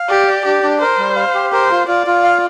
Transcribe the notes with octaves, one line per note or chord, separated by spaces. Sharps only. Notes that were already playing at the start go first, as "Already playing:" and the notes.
Already playing: F5
G4 D5
D5
D4 G4
D4
A#4 C5
G3
F5
G4
A#4 C5
F4
F4 D5
F4
F5